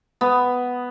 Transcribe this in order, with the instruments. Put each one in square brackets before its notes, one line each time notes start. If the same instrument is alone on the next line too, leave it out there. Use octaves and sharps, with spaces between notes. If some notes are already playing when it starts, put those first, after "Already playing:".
[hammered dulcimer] B3